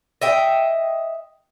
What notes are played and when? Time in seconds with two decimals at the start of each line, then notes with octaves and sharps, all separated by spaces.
0.22 D#5 E5 G5